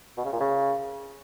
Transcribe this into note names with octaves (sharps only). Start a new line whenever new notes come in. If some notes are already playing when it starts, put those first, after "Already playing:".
B2
C#3
A#2
C#3